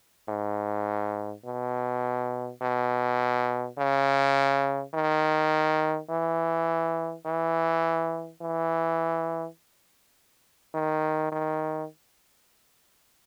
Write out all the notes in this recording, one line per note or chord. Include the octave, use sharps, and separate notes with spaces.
G#2
B2
B2
C#3
D#3
E3
E3
E3
D#3
D#3